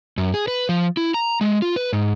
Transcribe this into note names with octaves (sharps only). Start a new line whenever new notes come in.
F#2
G#4
B4
F3
E4
A#5
G#3
F4
B4
G#2